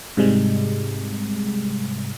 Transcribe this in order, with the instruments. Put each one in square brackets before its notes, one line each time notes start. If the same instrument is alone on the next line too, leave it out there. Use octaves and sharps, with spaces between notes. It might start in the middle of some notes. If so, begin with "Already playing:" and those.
[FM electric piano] G#2 C3 G3 G#3